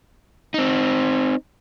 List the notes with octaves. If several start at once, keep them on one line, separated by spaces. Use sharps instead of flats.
C4 D#4